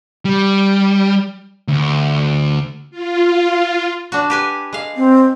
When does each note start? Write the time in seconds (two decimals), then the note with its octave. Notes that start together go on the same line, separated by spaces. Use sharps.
0.25 G3
1.68 D2
2.91 F4
4.12 D4 F#4
4.30 G4 B4 G#5
4.73 G#3 F5
4.97 C4